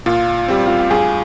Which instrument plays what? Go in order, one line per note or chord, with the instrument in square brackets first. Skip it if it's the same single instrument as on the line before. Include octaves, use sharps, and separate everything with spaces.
[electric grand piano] A#2 [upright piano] F4
[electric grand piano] G3 C4 [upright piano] G4
[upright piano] F4
G4
[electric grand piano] G2 [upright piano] G#4